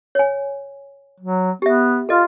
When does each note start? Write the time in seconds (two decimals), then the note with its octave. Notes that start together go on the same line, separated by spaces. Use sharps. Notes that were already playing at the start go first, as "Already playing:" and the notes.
0.15 C#5 G#5
1.20 F#3
1.62 B3 G4 E5
2.09 F4 A4 D#5